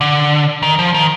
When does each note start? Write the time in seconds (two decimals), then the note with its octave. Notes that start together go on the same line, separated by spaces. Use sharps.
0.01 D3
0.62 D#3
0.79 F3
0.94 D#3